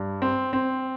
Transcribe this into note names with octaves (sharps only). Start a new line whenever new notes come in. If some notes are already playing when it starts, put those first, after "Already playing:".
Already playing: G2
C4
C4